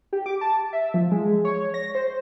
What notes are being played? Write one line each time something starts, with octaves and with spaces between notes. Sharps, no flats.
G4
D6
A5
E5
F3
G#3
C#5
A#6
C5